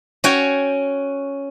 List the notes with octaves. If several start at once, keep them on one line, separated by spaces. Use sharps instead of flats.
C#4 F#4 C#5 G5